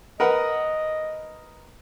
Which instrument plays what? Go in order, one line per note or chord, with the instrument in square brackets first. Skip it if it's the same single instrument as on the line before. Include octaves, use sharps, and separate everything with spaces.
[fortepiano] A#4 B4 F#5 [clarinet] D#5